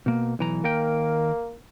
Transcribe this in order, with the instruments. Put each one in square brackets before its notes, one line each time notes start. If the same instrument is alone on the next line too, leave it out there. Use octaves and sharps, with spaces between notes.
[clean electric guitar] B2 A#3
B1 E3 A#5
[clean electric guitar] D#2 A#4 G5 [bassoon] A#3